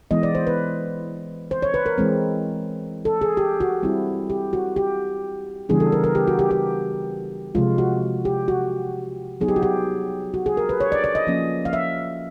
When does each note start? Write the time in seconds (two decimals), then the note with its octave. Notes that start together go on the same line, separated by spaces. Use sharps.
0.11 E3 G#3 B3 D#5
0.23 D5
0.35 C5
0.47 B4
1.51 C5
1.62 C#5
1.74 B4
1.86 A#4
1.98 E3 G#3 C4
3.05 A4
3.21 G#4
3.37 G4
3.60 F#4
3.83 G3 C4 E4
4.30 G4
4.53 F#4
4.76 G4
5.69 C#3 E3 G3 B3 D4 G#4
5.80 A4
5.92 A#4
6.04 A#4
6.15 G4
6.27 F#4
6.39 G4
6.51 G4
7.55 C3 F3 G#3 F4
7.78 F#4
8.25 G4
8.48 F#4
9.41 F#3 B3 D#4 G#4
9.48 G4
9.56 F#4
9.63 G4
10.34 F#4
10.46 G#4
10.57 A#4
10.69 B4
10.80 C#5
10.92 D5
11.04 D5
11.15 D#5
11.27 F3 A#3 C#4
11.65 F5
11.73 E5